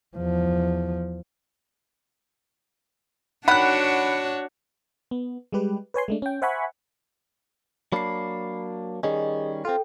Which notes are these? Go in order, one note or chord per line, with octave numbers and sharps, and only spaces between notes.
E2 F3
D#3 D4 F#4 C#5 F#5 B5 F#6
B3
G3 G#3 G4 B4
B4 C#5 G#5 C6
G#3 A3 D4
C#4 G5
C5 E5 F#5 G#5 B5 C#6
F#3 A#3 D4 B5 C7
D#3 G3 C#4 G#4 D#5
C4 F4 A4 G5